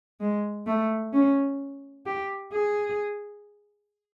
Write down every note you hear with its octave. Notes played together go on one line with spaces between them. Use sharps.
G#3
A3
C#4
G4
G#4